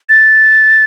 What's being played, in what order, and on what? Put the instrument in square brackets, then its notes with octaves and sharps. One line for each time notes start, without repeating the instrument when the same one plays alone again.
[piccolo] A6